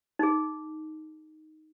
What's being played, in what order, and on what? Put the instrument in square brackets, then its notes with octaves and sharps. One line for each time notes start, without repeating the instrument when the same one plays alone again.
[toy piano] D#4 G#4